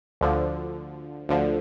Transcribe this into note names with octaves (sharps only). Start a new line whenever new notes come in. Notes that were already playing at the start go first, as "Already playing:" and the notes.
D2 D3 F3
D2 D3 F3